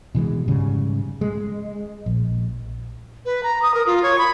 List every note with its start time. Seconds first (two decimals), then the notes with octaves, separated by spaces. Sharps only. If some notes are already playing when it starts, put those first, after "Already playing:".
0.15 B2 E3 F3 G#3
0.48 G#2 C#3 G3
1.21 G#3
2.06 A#1
3.25 B4
3.43 A#5
3.62 D#6
3.74 A#4
3.86 F4
4.03 C#5
4.18 B5